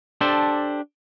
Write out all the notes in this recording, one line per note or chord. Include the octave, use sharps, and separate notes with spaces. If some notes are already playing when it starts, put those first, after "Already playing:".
D4 G4 A4 C5